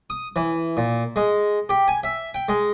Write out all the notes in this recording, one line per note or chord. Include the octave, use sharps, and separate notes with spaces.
D#6
E3
A#2
G#3
G4
G#5
E5
G5
G#3